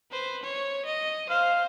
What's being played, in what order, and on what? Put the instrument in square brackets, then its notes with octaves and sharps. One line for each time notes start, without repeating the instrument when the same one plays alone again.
[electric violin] B4 C5
C#5
D#5
[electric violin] C5 [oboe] F5